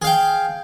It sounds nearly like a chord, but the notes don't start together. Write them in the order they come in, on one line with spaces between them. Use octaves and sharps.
G#4 F5 G5